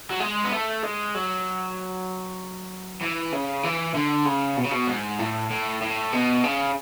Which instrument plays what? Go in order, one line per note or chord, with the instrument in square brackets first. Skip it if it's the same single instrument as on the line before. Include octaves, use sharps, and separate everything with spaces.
[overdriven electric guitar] F#3
G#3
B3
A3
G#3
F#3
E3
C#3
E3
D3
C#3
B2
C#3
B2
G#2
A2
A2
A2
B2
C#3